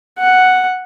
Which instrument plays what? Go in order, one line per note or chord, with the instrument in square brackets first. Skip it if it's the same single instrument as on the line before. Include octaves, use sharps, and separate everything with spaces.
[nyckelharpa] F#5